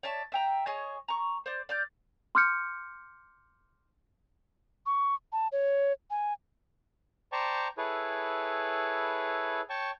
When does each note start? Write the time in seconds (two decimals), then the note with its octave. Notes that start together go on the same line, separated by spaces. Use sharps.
0.03 C#5 D5 E5 A5
0.32 E5 G5 A#5
0.66 G#4 C#5 D#5
1.08 A#5 C#6
1.46 C5 D5
1.69 D5 F6 G6
2.35 C6 D6 F6 G6 C#7
4.86 C#6
5.32 A5
5.52 C#5
6.10 G#5
7.32 C5 D5 G5 A5 A#5 C#6
7.78 E4 G#4 A4 B4 C#5
9.70 C#5 G5 A5 C#6